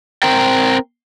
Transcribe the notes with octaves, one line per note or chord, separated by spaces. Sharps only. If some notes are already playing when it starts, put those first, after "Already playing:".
C4 A#4 G5